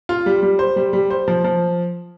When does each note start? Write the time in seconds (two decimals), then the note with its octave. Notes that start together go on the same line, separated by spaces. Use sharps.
0.09 F4
0.26 G3
0.43 G3
0.59 C5
0.76 G3
0.93 G3
1.10 C5
1.28 F3
1.44 F3